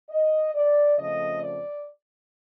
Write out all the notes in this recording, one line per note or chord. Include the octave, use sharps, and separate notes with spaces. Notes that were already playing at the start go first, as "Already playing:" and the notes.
D#5
D5
F2 C#3 F3 A3 C4 D#5
D5